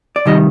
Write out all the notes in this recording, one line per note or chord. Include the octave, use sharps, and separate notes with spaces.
D5
C3 D#3 G3 D#5